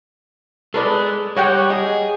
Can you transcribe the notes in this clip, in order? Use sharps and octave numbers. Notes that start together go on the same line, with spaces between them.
G#3 A4 B4 D5
G3 C#5 F#5 G5
G#4 D#5